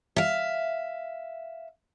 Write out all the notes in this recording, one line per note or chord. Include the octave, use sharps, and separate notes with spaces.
E5 F5